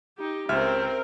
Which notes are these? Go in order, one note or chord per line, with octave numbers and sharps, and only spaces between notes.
D#4 G4
C#2 C4 A#4 E5 F6